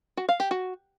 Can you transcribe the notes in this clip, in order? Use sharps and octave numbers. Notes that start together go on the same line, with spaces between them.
F#4
F5
G4
F#4